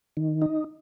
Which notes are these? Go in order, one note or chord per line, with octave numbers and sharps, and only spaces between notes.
D#3
D#4